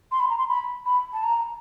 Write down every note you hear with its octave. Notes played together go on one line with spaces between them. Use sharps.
C6
B5
A#5
C6
B5
B5
A5
A#5